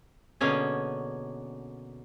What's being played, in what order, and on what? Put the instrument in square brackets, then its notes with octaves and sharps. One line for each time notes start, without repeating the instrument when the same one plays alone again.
[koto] B2 D3 A#3 C#4 G#4